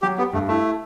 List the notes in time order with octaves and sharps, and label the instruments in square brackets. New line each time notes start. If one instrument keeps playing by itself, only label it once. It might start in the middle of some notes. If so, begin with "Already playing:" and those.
[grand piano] F#3 [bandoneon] G4
[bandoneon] B3 [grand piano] G4
[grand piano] G2 [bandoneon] A3
[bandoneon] A3 [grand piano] E4